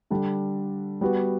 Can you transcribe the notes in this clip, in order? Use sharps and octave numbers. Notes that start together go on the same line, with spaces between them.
D3 G3 D4
G3 B3 F#4